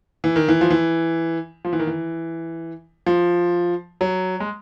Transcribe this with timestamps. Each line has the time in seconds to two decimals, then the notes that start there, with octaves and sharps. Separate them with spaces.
0.24 E3
0.36 D#3
0.48 E3
0.61 F3
0.70 E3
1.65 F3
1.73 E3
1.79 D#3
1.87 E3
3.06 F3
4.01 F#3
4.40 G#3